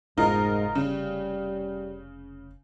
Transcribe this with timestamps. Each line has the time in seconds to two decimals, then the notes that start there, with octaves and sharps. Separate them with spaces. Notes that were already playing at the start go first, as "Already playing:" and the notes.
0.17 F1 G#2 D#4 F4 A#4
0.75 C#3 G3